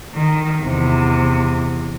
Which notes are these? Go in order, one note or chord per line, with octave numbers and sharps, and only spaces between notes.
D#3
E2 C3